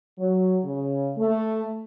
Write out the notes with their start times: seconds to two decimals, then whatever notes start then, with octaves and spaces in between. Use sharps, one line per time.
0.18 F#3
0.64 C#3
1.17 A3